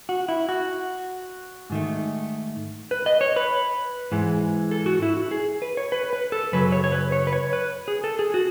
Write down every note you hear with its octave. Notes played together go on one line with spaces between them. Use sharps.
F#4
E4
F#4
G#2 D#3 A3
B4
D#5
C#5
B4
G#2 E3 G#3
A4
F#4
E4
F#4
G#4
B4
C#5
B4
B4
A4
F#2 C#3 F#3 B4
C#5
C#5
B4
C#5
B4
C#5
B4
G#4
A4
G#4
F#4